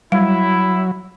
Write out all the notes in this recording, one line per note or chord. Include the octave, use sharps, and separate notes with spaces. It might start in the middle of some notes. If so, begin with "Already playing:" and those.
F#3 G3 E4